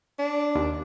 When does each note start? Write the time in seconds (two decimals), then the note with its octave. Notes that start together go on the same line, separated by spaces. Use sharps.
0.19 D4
0.55 D#2